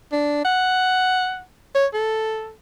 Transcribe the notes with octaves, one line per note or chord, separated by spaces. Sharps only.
D4
F#5
C#5
A4